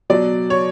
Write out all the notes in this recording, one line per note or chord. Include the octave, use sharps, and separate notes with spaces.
B2 F#3 D5
C#5